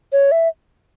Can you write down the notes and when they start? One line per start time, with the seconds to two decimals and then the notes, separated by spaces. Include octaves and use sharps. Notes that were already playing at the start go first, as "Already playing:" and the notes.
0.12 C#5
0.32 E5